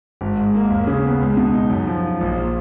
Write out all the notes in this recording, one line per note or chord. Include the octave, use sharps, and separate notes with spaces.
G#1
G#2
A#3
D#2
C#3
B3
C#2
B2
D#4
F#2
F3
F4
A#1
A#2